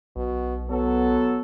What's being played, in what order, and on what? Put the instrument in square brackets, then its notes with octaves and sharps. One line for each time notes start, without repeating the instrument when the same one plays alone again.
[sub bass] B1 [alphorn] B2
[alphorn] F#3 [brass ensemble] B3 A4